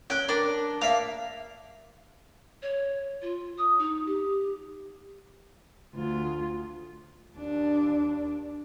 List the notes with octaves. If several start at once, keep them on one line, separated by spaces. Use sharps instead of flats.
C#4 G5 F#6
D4 A#4 D6
A#3 E5 F5
C#5
F4
D#6
D#4
G4
D2 F4
D#2 D4